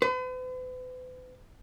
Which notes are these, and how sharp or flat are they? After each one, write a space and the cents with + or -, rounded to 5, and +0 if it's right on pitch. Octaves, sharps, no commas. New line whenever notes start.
B4 +45